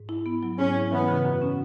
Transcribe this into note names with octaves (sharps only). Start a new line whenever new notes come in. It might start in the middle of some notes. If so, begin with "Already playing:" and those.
Already playing: G#2
E4
B3
F#3
G#2 C#4
E4
E3 B3
C#3
F#2
C#4